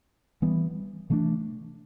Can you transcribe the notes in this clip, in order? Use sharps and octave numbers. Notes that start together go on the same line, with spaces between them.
E3 G3 B3
C3 E3 A3 D4